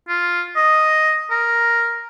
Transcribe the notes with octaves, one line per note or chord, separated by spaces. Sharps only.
F4
D#5
A#4